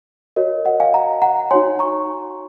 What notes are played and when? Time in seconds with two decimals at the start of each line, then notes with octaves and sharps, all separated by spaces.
0.36 F#4 A#4 C#5 D#5
0.65 D#5 F#5
0.80 F5 G#5
0.94 F#5 A#5
1.22 F#5 A#5
1.51 D#4 F#4 C#5 G#5 C6
1.79 A#5 C#6